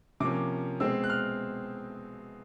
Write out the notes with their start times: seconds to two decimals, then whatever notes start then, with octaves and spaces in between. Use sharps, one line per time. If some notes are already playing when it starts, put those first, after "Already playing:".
0.20 C3 F3 A#3 C#4 D6
0.80 B2 G#3 C4 E6
1.04 F#6
1.10 F6